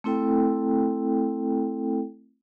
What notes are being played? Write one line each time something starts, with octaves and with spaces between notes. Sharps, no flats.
A3 C4 E4 A4 G5